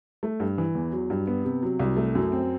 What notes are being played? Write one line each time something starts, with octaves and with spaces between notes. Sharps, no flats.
A3
G2
E3
E2
F#3
G2
B3
C3
F#3
C2
A3
F#2
C4